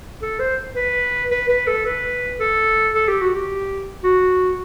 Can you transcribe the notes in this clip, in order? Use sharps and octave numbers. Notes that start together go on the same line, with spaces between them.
A4
C5
B4
B4
B4
A4
B4
A4
A4
G4
F#4
G4
F#4